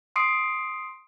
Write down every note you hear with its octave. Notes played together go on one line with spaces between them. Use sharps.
C6 D#6 C7 D7